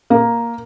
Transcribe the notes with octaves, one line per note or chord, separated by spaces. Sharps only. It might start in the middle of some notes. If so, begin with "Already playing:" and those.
A#3